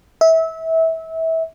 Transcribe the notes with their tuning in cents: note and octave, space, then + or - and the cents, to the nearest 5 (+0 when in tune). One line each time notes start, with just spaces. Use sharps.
E5 -25